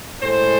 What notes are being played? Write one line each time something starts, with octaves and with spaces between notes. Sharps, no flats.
A2 G#3 C5